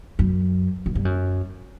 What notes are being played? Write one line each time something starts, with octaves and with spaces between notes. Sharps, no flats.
F#2
F#2
G2
F#2